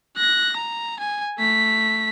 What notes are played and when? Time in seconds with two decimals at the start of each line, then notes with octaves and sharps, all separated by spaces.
0.17 F#6 A#6
0.57 A#5
1.00 G#5
1.39 A3 B6